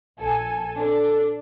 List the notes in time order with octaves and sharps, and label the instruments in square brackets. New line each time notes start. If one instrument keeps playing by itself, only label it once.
[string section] A#1 A4 G#5
[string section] D4 [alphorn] A4